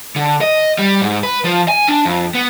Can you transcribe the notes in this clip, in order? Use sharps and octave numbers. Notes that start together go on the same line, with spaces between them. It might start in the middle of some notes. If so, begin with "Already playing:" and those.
D3
D#5
G3
G#2
B4
F3
G#5
D4
F2
B3